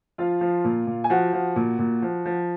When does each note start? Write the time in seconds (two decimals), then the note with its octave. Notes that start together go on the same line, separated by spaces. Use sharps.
0.18 F3 F4 F5
0.41 F3
0.64 A#2
0.87 A#2
1.04 G#5
1.10 F3 F#4 F#5
1.33 F3
1.56 A#2
1.79 A#2
2.02 F3
2.26 F3